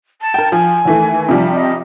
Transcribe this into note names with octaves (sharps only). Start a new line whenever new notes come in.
A5
A#4 G5
F3 G#5
D#2 E3 A3
C3 F3 G3
D#5